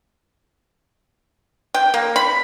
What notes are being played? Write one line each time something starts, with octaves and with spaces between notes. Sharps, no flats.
G5
A#3
B5